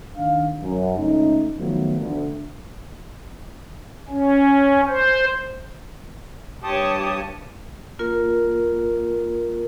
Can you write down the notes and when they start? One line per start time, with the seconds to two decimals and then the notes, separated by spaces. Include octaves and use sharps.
0.17 D#3 D4 F5
0.62 F#2
0.98 C#2 A3 C#4 D#4
1.58 D#3 F3 F#3 A3 B3
2.00 D2
4.09 C#4
4.88 C5
6.64 G2 G4 C#5 A5 D#6
7.99 A#3 F4 A#4